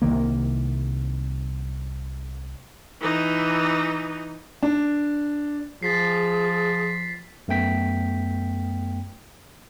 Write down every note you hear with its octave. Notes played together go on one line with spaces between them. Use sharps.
C2 C3 D#3 A#3
E3 D#4
D4
F3 G#4 A6 B6 C7
F#2 A3 B3 G5 B6